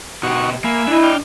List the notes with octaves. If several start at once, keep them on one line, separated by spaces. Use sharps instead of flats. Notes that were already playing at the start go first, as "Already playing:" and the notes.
B2 D#4 F#4 G4 C#6
A#3 E5 G#5 B5
D4 E4 D#5
D5 G5 F6